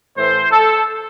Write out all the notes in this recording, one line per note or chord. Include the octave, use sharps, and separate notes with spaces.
A2 E3 C5
A4